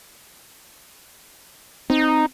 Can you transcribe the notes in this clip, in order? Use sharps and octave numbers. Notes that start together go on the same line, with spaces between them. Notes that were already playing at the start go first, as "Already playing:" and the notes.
C4 D#4